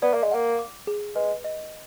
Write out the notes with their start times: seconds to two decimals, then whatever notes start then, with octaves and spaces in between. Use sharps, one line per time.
0.02 B3 D5
0.13 A#3
0.23 G#3
0.31 A#3 F#5
0.59 D6
0.87 G#4
1.15 G#3 B4
1.44 D#5